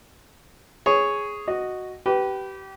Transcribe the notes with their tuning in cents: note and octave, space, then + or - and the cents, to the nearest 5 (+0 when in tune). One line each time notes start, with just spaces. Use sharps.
G#4 +0 C#5 +0
F#4 +0 D#5 -5
G4 -25 B4 +0